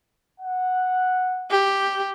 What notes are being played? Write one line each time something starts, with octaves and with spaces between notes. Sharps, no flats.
F#5
G4